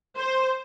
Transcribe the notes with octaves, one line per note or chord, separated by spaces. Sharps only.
C5